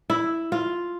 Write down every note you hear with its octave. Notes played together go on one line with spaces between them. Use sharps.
E4
F4